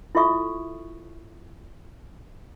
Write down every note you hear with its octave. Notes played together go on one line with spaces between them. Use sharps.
E4 F4 A4 E5 C#6 D#6